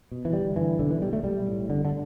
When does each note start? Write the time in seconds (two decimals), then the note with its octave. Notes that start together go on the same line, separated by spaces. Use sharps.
0.12 B2
0.25 E3
0.33 G1 G3
0.55 G2 D3 E3
0.79 B1 D3
0.91 E3
1.01 B2 G3
1.13 A3
1.23 B1 G3
1.47 A2
1.69 G1 D3
1.85 D3